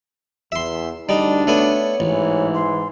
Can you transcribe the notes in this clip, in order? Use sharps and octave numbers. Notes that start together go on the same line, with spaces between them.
E2 E5 C6
D2 G3 D4 D#4
A3 B3 C#5 G#5
A1 G#2 E3
C6